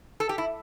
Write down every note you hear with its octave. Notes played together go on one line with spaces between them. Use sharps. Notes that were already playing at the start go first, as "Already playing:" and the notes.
A4
G4
E4